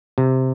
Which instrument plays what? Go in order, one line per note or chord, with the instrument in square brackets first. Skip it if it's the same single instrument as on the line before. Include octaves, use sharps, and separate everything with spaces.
[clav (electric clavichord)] C3